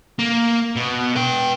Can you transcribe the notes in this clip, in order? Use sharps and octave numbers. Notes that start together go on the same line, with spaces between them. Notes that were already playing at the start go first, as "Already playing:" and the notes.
A#3
B2
B4 G5